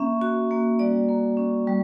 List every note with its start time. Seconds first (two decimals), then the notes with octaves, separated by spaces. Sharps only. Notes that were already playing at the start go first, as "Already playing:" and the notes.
Already playing: A#3 C#4 E5
0.21 F#4
0.51 A#3
0.79 G3 D5
1.09 A#3
1.37 C#4
1.67 G3